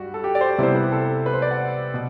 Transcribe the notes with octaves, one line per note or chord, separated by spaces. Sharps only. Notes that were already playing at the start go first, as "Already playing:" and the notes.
Already playing: G2 G3 F#4
A4
G4
D5
C5
C3 G3 B3 E4 C5
B4
G4
A4
B4
C5
D5
F#5
B2